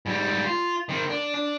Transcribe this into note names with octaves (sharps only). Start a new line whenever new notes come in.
G#2 G3
F4
D#3 C4
D4
D4